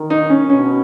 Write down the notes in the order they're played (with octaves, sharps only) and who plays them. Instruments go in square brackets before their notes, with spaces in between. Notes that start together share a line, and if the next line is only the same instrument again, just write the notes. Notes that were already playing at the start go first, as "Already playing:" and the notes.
Already playing: [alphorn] D#3
[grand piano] D#4
C#4
[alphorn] B2 [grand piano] C#4